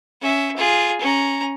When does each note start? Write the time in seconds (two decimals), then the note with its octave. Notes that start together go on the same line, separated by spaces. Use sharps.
0.22 C#4 E5
0.56 F4 G#4
1.01 C#4 A#5